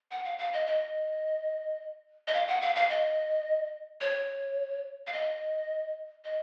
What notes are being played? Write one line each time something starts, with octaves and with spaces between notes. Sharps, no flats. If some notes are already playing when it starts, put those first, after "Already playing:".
F#5
F5
F5
D#5
D#5
D#5
F5
F#5
F5
F5
D#5
C#5
F5
D#5
D#5